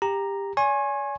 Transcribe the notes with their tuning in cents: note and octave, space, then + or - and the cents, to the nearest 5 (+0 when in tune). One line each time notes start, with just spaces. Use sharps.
G4 +20 A#5 +0
D5 -45 G#5 +0 C#6 -45